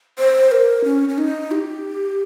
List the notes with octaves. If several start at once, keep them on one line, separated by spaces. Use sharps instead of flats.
C5
A#4
C#4
C#4
D#4
G4